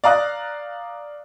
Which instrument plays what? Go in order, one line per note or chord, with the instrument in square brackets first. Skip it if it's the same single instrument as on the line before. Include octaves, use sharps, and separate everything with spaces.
[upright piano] D5 F5 A#5 D#6 F#6